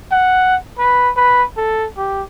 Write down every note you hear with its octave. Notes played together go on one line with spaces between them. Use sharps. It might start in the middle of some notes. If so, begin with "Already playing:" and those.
F#5
B4
B4
A4
G4